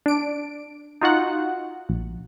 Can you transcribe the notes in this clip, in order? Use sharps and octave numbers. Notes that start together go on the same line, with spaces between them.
D4 D7
D#4 F4 F#4 F#5
A#1